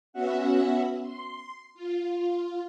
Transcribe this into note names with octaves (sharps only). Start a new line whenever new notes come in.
B3 C#4 F#4 E5 F#5
C6
F4